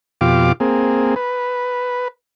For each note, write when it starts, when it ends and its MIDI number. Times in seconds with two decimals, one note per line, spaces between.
0.21 0.52 41
0.21 0.52 47
0.21 0.52 65
0.21 0.52 67
0.21 0.52 77
0.21 0.52 86
0.60 1.15 58
0.60 1.15 60
0.60 1.15 68
1.16 2.08 71